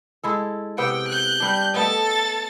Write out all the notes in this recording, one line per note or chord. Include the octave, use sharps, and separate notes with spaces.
G#3 E4 A4
C3 B3 F#5 G5
F#6 G6
G3 D4
A3 B3 A4 D#5 A6